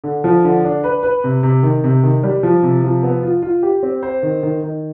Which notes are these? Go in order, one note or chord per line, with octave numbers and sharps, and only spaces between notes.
D3
F3
D3
D4
B4
B4
C3
C3
D#3
C3
D#3
G3
F3
C3
F3
B3
F4
F4
G4
C4
C5
D#3
D#3
D#3